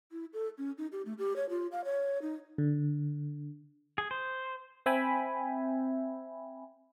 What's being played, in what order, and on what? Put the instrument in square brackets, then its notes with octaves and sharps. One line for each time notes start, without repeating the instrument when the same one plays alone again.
[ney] E4
A4
C#4
D#4
G4
A3
G4
C#5
F4
F5
C#5
D#4
[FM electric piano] D3
[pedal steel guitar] G#4
C5
[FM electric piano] C4 E5 G5 G#5 B5